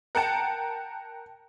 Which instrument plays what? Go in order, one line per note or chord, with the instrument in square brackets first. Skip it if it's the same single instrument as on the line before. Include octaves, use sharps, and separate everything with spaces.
[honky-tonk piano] A#4 F#5 G5 A5